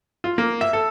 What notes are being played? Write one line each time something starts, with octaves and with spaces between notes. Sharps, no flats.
F4
A#3
E5
A4